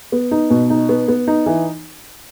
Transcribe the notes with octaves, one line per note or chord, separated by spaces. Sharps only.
B3
D#4
B2
D#4
B3
B3
D#4
E3